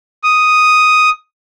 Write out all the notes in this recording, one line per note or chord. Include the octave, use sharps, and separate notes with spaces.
D#6